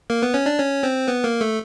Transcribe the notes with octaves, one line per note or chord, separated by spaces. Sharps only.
A#3 A#4
B3 B4
C#4 C#5
D4 D5
C#4 C#5
C4 C5
B3 B4
A#3 A#4
A3 A4